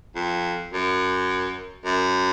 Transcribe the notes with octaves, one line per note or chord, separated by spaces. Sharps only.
F2
F#2
F#2